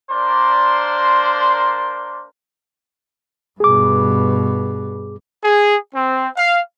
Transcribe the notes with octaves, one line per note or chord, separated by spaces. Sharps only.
A#3 D4 A#4 C5 D5 C6
G2 B2 G#4 D6
G#4
C4
F5